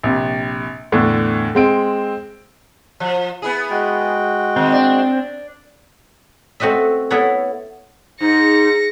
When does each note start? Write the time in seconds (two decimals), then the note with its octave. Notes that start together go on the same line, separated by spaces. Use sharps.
0.03 A#1 C3
0.92 E2 A2 D3
1.55 G#3 C4 D7
3.00 F3
3.42 B3 E4 G#4
3.71 G#3 F#4 G5
4.56 D#3 C4
4.73 D4
6.60 A3 C4 F#4 D#5 E5
7.11 B3 E4 A4 C#5 F#5
8.21 G#2 D#4 A#6 C#7